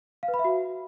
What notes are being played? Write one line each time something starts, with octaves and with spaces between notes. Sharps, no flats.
F5
B4
B5
E5
F#4